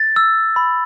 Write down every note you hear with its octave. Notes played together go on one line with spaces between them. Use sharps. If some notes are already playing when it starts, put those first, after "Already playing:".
Already playing: A6
E6
B5